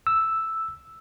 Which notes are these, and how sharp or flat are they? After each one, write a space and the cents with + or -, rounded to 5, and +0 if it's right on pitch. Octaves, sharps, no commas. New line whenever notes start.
E6 +0